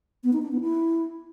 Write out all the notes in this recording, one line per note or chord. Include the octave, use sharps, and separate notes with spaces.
B3
D#4
D4
B3
E4